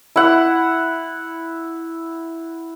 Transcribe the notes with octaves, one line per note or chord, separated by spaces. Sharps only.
E4 F#5